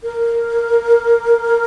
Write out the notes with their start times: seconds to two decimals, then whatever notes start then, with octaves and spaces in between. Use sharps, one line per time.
0.04 A#4